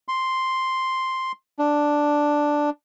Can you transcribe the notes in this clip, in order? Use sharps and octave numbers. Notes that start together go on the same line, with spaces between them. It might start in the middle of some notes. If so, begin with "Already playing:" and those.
C6
D4